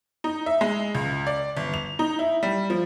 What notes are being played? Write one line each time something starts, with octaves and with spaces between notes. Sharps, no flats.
D#4
E5
G#3
C#2
D5
G1
F7
D#4
E4
G3
F3